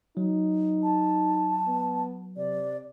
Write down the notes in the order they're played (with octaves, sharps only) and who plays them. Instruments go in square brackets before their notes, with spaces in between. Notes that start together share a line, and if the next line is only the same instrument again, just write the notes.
[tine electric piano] F#3 [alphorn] D#4
[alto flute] A5
[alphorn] B3
[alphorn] C3 [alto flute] D5